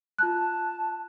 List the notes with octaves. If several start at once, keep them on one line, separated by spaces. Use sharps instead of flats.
F4 A5 F#6